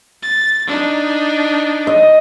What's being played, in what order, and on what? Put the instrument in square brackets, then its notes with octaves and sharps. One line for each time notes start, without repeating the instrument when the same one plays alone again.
[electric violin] A6
D4 D#4
[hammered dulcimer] D#5